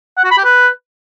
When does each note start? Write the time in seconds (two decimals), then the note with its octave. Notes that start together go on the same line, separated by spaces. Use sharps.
0.18 F#5
0.24 F#4
0.31 B5
0.38 G4
0.45 B4